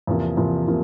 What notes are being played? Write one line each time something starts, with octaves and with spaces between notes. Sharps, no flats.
E2 C3 F3 A#3
E2 C3 F3 A#3
C3 F3 A#3